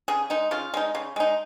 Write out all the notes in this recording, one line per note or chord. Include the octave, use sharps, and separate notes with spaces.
C#3 G#4
G#3 D#4
C#3 F4
G#3 D#4
C#3
G#3 D#4